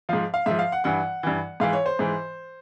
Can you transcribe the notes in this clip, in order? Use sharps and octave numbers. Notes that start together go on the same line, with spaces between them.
G#2 F3 F5
F5
G#2 F3 E5
F5
F#5
G2 E3 F#5
G2 E3
G#2 E3 F5
C#5
C5
G#2 E3